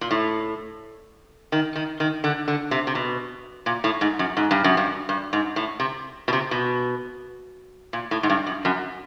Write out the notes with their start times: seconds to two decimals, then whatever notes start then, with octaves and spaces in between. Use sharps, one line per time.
0.01 A#2
0.11 A2
1.52 D#3
1.76 D#3
2.00 D#3
2.24 D3
2.48 D3
2.71 C3
2.87 C3
2.95 B2
3.66 A#2
3.84 A2
4.01 G#2
4.19 F#2
4.37 G#2
4.51 G2
4.64 F#2
4.77 G2
5.09 G2
5.33 G#2
5.56 A2
5.80 C3
6.28 B2
6.33 C3
6.51 B2
7.93 A#2
8.11 A2
8.23 G#2
8.30 G2
8.47 F#2
8.65 F#2